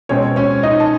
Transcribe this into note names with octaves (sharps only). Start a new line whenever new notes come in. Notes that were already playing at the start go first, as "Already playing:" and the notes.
B2 G#3 C4 C#4 C#5
C#4 C#5
D#4 D#5
A5